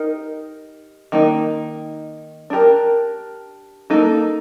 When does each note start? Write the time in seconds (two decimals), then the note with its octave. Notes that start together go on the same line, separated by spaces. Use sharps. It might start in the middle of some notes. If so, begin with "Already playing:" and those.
Already playing: D#4 G4 A#4
1.12 D#3 A#3 D#4
2.50 D4 G4 A#4
3.90 A#3 D#4 A4